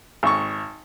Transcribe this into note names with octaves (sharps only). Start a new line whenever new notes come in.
G#1 C#6